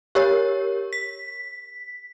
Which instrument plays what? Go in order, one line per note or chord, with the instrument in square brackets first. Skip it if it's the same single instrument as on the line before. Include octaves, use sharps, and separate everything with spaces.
[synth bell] G4 A#4 C#5
B6